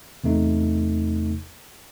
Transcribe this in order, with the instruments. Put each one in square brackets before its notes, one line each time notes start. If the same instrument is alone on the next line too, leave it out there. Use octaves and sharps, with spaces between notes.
[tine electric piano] E2 C3 A3 D#4